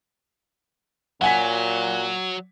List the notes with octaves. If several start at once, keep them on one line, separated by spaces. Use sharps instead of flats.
A#2 F#3 F#5 G#5 B6